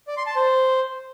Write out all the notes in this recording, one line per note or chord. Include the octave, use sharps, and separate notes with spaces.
D5
C6
A5
C5